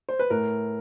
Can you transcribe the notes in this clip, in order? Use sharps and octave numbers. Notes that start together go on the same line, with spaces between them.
C5
B4
A2 A#4